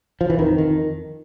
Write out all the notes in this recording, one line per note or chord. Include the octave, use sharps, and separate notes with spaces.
F3
E3
F2 D#3
D#3